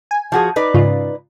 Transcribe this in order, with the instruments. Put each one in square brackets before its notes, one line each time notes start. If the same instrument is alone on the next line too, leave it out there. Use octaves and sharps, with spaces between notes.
[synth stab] G#5
[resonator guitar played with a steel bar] F3 F#4 G#4
D#4 B4 D5
[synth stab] G#2 C#3 F4